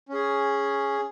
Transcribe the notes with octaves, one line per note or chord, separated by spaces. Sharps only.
C#4 G#4